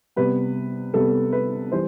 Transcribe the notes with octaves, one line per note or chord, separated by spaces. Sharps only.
C3 G3 B3 B4
C3 G3 B3 A4
B4
E3 G3 C5